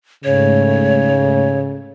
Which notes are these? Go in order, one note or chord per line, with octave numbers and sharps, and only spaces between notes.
G#2 C#3 A3 C#5